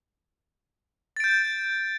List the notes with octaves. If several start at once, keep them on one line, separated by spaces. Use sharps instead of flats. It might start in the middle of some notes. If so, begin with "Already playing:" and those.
G6 A6 D7